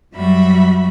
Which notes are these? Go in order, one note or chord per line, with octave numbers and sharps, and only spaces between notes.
F#2 F#3 G3 F#4 E5 B5